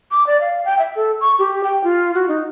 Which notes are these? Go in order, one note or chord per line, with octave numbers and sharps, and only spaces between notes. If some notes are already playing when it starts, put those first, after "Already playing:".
D6
D5
F5
G5
E5
A4
C#6
G4
G5
F4
F#4
D#4